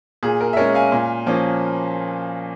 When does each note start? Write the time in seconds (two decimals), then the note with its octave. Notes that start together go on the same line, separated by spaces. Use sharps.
0.23 A#2 G#4
0.41 A#4
0.53 E5
0.57 G#3 C#4 A#4 C#5
0.74 F5 G#5
0.92 A#2
1.26 F3 A#3 C#4